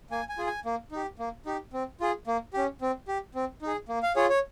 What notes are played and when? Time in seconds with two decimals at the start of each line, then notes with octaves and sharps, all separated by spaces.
0.11 A#3 G#5
0.29 G#5
0.38 F4 G#4
0.47 G#5
0.65 A#3
0.92 D#4 G4
1.19 A#3
1.46 D#4 G4
1.73 C4
2.01 F4 G#4
2.27 A#3
2.54 C#4 G4
2.81 C4
3.08 G4
3.35 C4
3.62 D#4 G#4
3.89 A#3
4.03 F5
4.16 F4 G#4 C#5
4.29 C#5